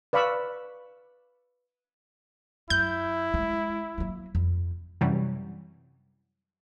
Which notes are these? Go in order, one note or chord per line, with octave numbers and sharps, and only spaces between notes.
B4 D5 F5 B5 C#6 E6
F#2 E4 G6
G#3
F#3 A#3
F2
F#2 C3 E3 F#3 G3